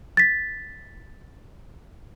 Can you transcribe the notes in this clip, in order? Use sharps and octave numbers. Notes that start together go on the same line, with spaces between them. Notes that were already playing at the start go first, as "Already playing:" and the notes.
A6 B6